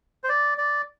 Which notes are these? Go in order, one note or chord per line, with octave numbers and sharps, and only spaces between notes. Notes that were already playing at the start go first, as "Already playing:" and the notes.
C5
D5
D5